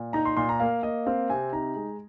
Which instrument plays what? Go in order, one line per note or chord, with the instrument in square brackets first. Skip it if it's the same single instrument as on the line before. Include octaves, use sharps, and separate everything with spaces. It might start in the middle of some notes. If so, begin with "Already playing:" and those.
Already playing: [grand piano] A#2
D#4 A#5
C6
A#2 C6
A#5
A#3 F5
A#3 D#5
C4 F5
C3 G#5
D#4 A#5
G#3